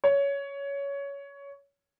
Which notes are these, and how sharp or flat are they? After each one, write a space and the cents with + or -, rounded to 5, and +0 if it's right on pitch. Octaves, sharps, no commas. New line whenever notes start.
C#5 +15